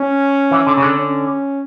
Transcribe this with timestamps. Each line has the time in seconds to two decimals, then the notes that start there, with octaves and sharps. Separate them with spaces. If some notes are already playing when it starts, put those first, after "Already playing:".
Already playing: C#4
0.51 E3
0.67 D3
0.77 C#3
0.82 D3
0.97 C#4